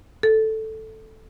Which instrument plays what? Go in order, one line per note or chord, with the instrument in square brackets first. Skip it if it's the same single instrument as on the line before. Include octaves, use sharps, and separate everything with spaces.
[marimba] A4